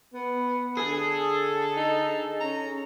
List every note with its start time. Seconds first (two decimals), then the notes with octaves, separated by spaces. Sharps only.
0.14 B3
0.77 D3 G#4 A4
1.77 D#4
2.40 C#4 A#5